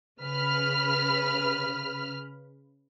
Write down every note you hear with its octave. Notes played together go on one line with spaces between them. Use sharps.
C#3 B4 B5 F6